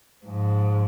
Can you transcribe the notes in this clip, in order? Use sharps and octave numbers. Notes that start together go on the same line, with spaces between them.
G#2 F3